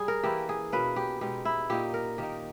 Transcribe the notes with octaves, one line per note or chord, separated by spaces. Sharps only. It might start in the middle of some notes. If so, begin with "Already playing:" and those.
Already playing: G3 G#4
A#4
E3 A#3 C#4 E4 G4
G#4
B2 A#3 C#4 B4
G4
B2 G#3 D#4 G4
E4
A#2 A#3 D#4 G4
A#4
D#3 A#3 D#4 G4